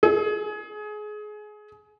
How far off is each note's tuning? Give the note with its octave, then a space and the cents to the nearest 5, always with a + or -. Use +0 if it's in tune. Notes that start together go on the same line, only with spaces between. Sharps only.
G#4 +25